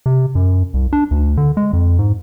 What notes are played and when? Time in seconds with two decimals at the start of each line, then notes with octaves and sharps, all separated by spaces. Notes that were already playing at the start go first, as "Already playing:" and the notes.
0.06 C3
0.35 F#2
0.74 C2
0.93 D4
1.11 D2
1.37 D3
1.57 G#3
1.73 F2
1.99 G#2